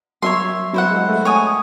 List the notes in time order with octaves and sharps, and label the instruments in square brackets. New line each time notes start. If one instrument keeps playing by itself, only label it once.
[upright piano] F#3 [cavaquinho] C#5 E5 C6
[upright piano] F#3 [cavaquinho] E4 C5 F#5
[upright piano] G#3
A3
[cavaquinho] C#5 G#5 D#6